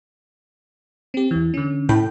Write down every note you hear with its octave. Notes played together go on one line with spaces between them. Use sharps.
C4 G4
E2 E3
D3 C#4
A2 G5